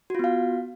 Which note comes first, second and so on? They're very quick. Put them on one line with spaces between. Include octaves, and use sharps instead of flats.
F#4 F4 B3 F5